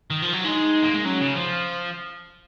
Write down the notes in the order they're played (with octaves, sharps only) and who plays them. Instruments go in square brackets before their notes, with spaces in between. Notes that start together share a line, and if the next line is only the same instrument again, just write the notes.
[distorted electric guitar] D#3
F3
F#3
[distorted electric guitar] G#3 [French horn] D#4
[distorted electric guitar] A#3
G#3
[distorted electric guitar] F#3 [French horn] C#4
[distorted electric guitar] C#3
F3